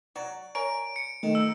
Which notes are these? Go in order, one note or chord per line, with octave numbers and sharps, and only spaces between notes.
F#3 F#4 D5
A#4 C#5 G#5 D7
C#7
D#3 A3
F3 D#4 E6